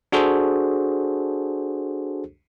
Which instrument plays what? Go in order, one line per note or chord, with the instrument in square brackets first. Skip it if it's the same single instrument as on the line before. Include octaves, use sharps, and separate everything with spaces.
[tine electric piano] D4 F#4 G#4 A4 C5